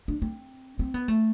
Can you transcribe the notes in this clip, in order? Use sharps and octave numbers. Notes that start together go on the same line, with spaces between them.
D4
C4
C4
B3
A3